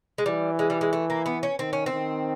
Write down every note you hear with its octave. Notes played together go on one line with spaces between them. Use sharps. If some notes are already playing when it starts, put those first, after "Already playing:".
G#3
E3 G3
G#3
G3
G#3
A3
A#3
B3
C#4
D#3 C4
C#4
C4
D#3